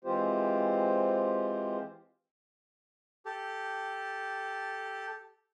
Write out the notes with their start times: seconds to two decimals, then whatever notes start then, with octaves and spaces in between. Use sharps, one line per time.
0.04 E3 G#3 C4 F4 G4 C5
3.25 G4 A4